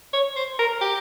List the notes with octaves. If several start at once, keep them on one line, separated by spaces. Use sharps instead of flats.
C#5
C5
A#4
G4